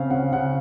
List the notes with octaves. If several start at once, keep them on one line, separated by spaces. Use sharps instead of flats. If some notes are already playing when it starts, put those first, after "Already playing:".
Already playing: C#3 C4 F5
C#3 F#5
C#3 F#5